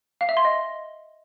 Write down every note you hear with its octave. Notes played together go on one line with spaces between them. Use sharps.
F5
E5
C6
D#5